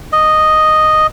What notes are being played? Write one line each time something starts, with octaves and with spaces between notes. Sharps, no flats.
D#5